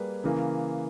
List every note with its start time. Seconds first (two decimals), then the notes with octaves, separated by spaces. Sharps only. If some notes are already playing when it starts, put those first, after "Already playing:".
Already playing: G3 A#3 G#4 B4
0.24 C#3 E3 A#3